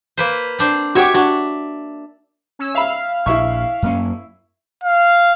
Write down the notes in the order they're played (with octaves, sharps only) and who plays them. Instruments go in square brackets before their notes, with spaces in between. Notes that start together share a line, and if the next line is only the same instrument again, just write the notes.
[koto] A#3 B4 C5
C4 D4 C5
[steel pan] F#4 G4 D6 [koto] C#5 E5
[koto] D4 [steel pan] F#4
[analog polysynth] C#4 E6
[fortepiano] E5 B5 [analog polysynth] F5
[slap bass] A#1 [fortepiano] E4 E5 C#6
[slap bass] F#2 A#3 C#4
[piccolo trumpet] F5